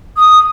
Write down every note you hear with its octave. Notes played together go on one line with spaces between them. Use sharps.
D#6